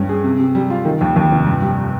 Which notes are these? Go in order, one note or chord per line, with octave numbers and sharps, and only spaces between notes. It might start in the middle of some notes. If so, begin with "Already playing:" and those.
Already playing: G2 G3 C#4
G#4
C3
C3
G3
F4
D#3
D#2
D#2
F1
G2
G3